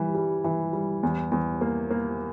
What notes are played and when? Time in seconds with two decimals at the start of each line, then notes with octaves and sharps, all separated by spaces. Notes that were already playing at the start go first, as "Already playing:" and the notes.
Already playing: E3 G3
0.15 G3
0.44 E3
0.73 G3
1.03 E2
1.32 E2
1.61 A#3
1.91 A#3